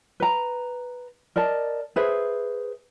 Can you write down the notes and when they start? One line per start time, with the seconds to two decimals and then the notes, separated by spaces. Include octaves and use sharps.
0.20 B4 A#5
1.36 A#4 D5 D#5 A5
1.96 G#4 B4 C5 E5